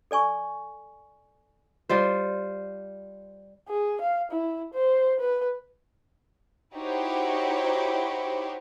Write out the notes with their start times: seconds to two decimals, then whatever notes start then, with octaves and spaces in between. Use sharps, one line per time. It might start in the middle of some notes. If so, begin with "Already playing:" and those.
0.11 A4 D5 G#5 C#6
1.89 G3 F4 C5
3.68 G#4
4.01 F5
4.31 E4
4.73 C5
5.19 B4
6.74 D#4 E4 F#4 G4 C5 C#5